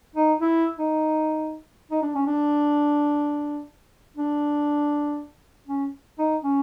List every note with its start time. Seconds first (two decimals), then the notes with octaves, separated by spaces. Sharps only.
0.15 D#4
0.40 E4
0.78 D#4
1.91 D#4
2.02 D4
2.15 C#4
2.26 D4
4.16 D4
5.67 C#4
6.19 D#4
6.43 C#4